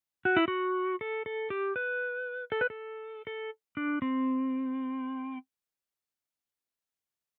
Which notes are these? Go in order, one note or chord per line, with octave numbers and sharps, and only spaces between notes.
F#4
E4
F#4
A4
A4
G4
B4
A4
B4
A4
A4
D4
C4